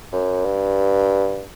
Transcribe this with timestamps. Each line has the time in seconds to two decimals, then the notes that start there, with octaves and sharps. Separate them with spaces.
0.12 F#2
0.45 G2